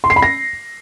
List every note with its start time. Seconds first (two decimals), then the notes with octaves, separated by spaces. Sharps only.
0.04 C6
0.10 C7
0.16 B5
0.22 A#6